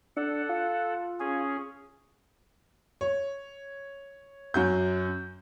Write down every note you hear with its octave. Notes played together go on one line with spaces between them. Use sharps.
D4 A4 F#5
F4
C#4 G#4
C#5
F#2 F#4 G6